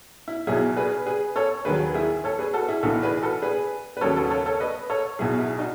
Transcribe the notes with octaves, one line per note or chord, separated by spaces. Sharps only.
E4
B1 B2 F#3 E4 G#4
G#4 B4
G#4 B4
A4 C#5
D#2 D#3 F#3 G#4 B4
E4 G#4
A4 C#5
G#4 B4
F#4 A4
E4 G#4
B1 A2 E3 F#4 A4
G#4 B4
F#4 A4
G#4 B4
B4
D#2 C#3 F#3 A4 C#5
F#4 A4
A4 C#5
A4 C#5
B4 D#5
A4 C#5
B1 B2 F#3 E4 G#4
E4 G#4
D#4 F#4